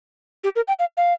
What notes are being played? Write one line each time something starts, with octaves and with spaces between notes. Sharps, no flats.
G4
A#4
G5
F5
F5